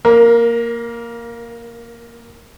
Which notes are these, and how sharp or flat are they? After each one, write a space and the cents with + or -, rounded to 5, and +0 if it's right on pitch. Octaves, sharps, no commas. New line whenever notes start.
A#3 +0 A#4 +30